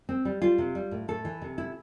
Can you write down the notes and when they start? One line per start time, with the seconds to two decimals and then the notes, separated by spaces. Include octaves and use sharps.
0.09 C4
0.25 G3
0.42 G3 F4
0.58 C3
0.75 G3
0.91 A2
1.08 A2 A4
1.25 E3
1.42 C3
1.58 E4